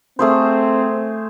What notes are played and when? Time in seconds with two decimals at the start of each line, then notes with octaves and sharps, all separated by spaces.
0.19 A3 C4 G#4 C5